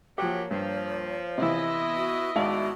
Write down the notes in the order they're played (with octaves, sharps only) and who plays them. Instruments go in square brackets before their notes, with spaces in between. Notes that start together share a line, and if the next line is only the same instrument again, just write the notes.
[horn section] C#3 F#3 [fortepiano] F3 G4 [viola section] A#3 [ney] C#5
[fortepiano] G2 [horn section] F3
[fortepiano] C3 E3 [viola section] B3 E4 D#5
[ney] F#4
[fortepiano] G#1 G#2 F5 [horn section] A3 D5 [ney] F#4